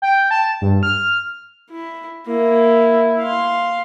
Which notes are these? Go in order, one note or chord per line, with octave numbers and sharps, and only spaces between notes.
G5
A5
G2
F6
E4
A#3 E4
F5 C6